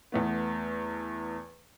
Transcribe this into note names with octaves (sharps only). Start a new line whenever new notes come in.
E2 A3 B3